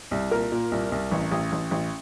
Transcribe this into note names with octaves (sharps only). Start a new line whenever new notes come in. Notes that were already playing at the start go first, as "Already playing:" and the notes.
C2
A#2 A#4
A#2
C2
C2
A1
A1
A1
A1